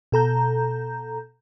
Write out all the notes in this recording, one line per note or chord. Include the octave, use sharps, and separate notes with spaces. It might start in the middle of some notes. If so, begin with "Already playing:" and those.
B2 A4 A#5 G6